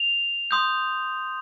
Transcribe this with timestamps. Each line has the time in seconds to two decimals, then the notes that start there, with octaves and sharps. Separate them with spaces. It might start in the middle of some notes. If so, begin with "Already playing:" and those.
Already playing: F7
0.51 C6 D#6 G6